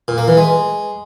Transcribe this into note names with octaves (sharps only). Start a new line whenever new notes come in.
A#2
A#3
E3
G#3